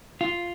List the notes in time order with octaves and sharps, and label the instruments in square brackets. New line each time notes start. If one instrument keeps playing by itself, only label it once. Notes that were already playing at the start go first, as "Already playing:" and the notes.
[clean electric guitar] F4